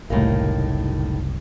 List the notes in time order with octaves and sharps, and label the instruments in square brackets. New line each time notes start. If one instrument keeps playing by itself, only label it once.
[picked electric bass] F#1 C2 [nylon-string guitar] A2 D#3 A#3